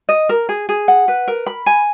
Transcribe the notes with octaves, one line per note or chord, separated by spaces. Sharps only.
D#5
A#4
G#4
G#4
F#5
B4
A#4
B5
G#5